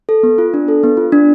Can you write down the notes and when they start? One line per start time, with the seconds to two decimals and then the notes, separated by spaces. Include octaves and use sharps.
0.09 A4
0.23 B3
0.38 F4
0.54 D4
0.68 A4
0.83 B3
0.97 F4
1.12 D4